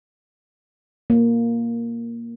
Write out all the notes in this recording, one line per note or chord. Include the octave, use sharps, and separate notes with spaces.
A#3